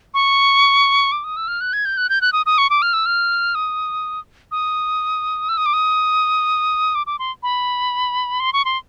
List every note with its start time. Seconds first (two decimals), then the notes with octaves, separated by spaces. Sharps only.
0.14 C#6
1.12 D6
1.24 D#6
1.37 E6
1.48 F6
1.61 F#6
1.73 G#6
1.85 G6
1.97 F#6
2.09 G6
2.21 F#6
2.33 D#6
2.46 D#6
2.58 C#6
2.70 D6
2.82 F6
2.93 E6
3.06 F6
3.55 D#6
4.52 D#6
5.49 E6
5.57 D#6
5.66 D6
5.73 D#6
6.95 D6
7.07 D6
7.19 C6
7.43 B5
8.40 C6
8.53 C#6
8.65 C6